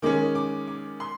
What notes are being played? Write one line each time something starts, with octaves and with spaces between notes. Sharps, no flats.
D#3 G#3 C#4 D6
D6
D6
C6